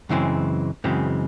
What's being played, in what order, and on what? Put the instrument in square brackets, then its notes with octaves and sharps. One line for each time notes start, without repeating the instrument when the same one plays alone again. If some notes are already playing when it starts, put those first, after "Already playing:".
[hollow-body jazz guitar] F#2 C#3 E3 G#3 C4
F#2 C#3 E3 G#3 C4